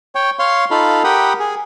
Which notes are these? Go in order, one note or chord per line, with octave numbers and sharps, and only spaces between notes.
C#5 G5
C#5 F5 C6
D#4 F4 A4 F5 B5
G4 A#4 F#5 G5 B5 D#6
G#4